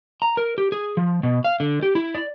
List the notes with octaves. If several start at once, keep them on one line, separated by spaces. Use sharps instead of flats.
A#5
A#4
G4
G#4
F3
B2
F5
D3
G4
E4
D5